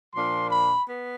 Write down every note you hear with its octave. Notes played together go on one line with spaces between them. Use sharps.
A#2 F3 A#3 D4 C6
B5
B3